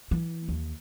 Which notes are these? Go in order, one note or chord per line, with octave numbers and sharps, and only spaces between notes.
E3
D#2